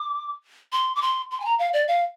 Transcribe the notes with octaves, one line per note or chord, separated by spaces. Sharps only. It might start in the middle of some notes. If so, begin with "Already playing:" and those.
Already playing: D6
C6
D6
C6
C6
G#5
A#5
F5
D5
F5